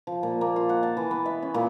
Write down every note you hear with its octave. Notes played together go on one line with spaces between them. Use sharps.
F3
A#2
A#3
F4
F#5
A5
E3
B3
E5
C#4
A#2